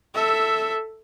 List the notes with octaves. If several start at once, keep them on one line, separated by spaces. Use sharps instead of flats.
A4 E5